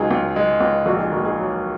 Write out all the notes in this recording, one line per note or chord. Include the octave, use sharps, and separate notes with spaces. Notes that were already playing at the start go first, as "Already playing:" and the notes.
Already playing: C#2 F#3 D#4 G#4
C#2
G#3
C#2
A#1 F#4
D#4 G#4
A#1 F#4 A#4
D#4 G#4
F#3